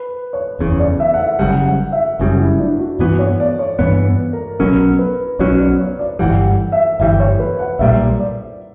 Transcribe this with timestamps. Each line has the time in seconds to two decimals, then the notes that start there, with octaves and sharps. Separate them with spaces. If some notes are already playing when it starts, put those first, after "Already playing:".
Already playing: B4
0.33 C#5
0.59 F#1 E2 C#3
0.79 D5
1.00 E5
1.14 F#5
1.19 E5
1.39 F#1 F#2 C#3 G3 F#5
1.66 F#5
1.92 E5
2.19 F#1 F#2 C#3 G3 F#4
2.40 E4
2.60 D4
2.79 F#4
2.99 G2 E3 B3 F#4
3.19 C#5
3.40 D5
3.59 C#5
3.79 G2 E3 B3 C#5
4.33 A#4
4.59 B1 B2 F#3 C#4 A#4
4.99 B4
5.39 B1 B2 F#3 C#4 C#5
5.59 D5
5.79 C#5
5.99 D5
6.19 G1 G2 E3 G3 F#5
6.46 F#5
6.72 E5
6.99 G1 G2 E3 G3 E5
7.20 C#5
7.40 B4
7.59 F#5
7.79 B1 A#2 G3 E5
8.20 D5